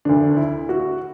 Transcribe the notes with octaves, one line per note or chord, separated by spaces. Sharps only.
D2 D3 D4
E4
F#4